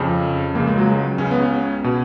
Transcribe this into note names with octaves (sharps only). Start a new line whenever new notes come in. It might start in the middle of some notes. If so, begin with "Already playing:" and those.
Already playing: F2 C#3
C#2 C#3 A#3
G#3
F#3
G#3
C#2 C#3 C#4
B3
C#4
B2